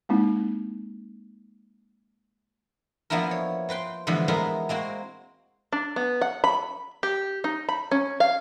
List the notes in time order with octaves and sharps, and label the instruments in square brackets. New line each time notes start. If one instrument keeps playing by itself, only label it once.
[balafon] G#3 A#3 C4 D#4 E4
[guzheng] F3 A#3 B3 D4 E4 A#4
C#5
C4 B4 G5 C6
D3 E3 F3 G3 G#3 B3
G#3 B3 E4 G#4 A#4 C5
G#3 A#3 C4 F#4
[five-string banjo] D4
B3
F#5
B5
G4
D#4
B5
C#4
F5